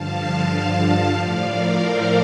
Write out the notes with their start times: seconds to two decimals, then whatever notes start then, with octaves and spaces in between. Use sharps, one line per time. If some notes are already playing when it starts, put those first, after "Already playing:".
Already playing: G2 D3 F3 F5 A5
1.13 A2 F3 D5 F5
1.45 A#4 D5
1.78 A4 C5